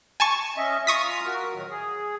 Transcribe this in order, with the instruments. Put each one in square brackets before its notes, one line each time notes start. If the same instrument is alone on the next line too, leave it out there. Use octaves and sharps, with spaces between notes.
[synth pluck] G#5 A5 C#6
[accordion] C#4 D#5 E5
[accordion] F4 A#5 F6 [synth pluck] C#6 D#6 B6
[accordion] F#4 A#4 F6
A2 D#3 F#3
G#4